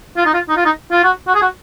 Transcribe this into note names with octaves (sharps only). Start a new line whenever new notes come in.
F4
D#4
F4
D#4
F4
D#4
F4
F#4
F#4
G#4
F#4